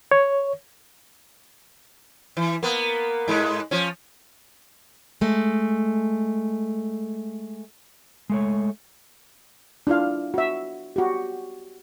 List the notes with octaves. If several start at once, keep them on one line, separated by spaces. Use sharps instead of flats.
C#5
E3
A#3 B3
G#2 G#3
F3 C#4
G#3 A3
G#3 A3 C#5
D4 E4 F4 F5
F#4 E5
F#4 G4